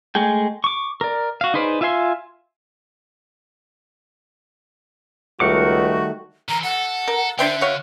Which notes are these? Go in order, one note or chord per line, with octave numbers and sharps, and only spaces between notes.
G#3 A3 G#4 G5
C#6 D6
A#4 D5
F#4 F5
D#4 G#4 B4 C5 D5
F4 E5 F5 G#5 C6
C#2 D#3 G3 A3 F#4 A#4 F#5 D6
D3 E3 A#5
A4 F#5
A#4
D3 D4 C5 E5 G5
F#4 C#5 F5